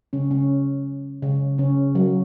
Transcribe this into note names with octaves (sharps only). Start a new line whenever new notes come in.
C#3 C#4
C#3 C#4
C#3 C#4
C#3 C#4
F#3